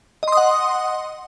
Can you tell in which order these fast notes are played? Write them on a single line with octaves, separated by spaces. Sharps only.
D#5 C6 D#6 F#5